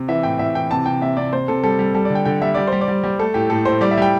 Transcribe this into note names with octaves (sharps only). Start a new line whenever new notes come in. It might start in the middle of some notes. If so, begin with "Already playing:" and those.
Already playing: C3
E3 E5
A2 G5
A2 E5
E3 G5
C3 A5
C3 G5
C3 E5
C3 D5
C3 C5
C3 A4
G3 A4
G3
G3 A4
D3 D5
G5
D3 G5
G3 E5
G3 D5
G3 C5
D5
G3
G3
A3 A4
A2 G4
A2 A4
A2 C5
G3 D5
E5
G3 G5